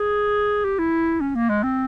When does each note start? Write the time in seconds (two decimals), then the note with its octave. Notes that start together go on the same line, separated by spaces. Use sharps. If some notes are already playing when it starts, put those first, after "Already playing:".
Already playing: G#4
0.65 G4
0.79 E4
1.21 C#4
1.36 A#3
1.50 G#3
1.64 C4